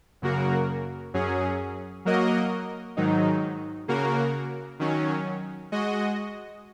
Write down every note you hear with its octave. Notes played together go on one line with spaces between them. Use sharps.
F#2 C#3 A#3 F#4 A#4
F#2 F#3 C#4 G#4
F#3 A#3 F#4 A#4 D#5
G#2 D#3 F#3 D#4
C#3 A#3 F#4 A#4
D#3 F#3 C#4
G#3 F#4 D#5